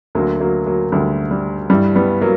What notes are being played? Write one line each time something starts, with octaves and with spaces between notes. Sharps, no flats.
D2 D3 F#3 A#3
F#3 A#3
F#3 A#3
D2 D3 G3
G3
G2 E3 G3
G3 B3
F#3 A#3